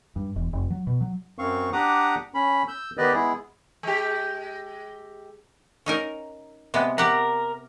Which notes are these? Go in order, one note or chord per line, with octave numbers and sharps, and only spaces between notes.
G2
E1
F1
F#3
B2
F#3
F#2 C4 F5 C#6
D4 G4 F#5 A#5 D6 D#6
C#4 B5
E6 G6
D#3 B3 G4 B4 D5 D#5
G#3 B3 E4 G#4
G#3 G4
C#4 D#4 A#4
C3 G#3 B3
G4 A#4 F#5